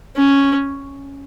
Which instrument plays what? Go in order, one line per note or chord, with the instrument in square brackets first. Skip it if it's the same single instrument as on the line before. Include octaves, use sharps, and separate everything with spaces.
[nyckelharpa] C#4